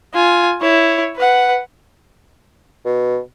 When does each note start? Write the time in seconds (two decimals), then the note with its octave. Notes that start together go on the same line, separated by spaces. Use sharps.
0.14 F4 G#5
0.61 E4 C#5
1.16 B4 F#5
2.85 B2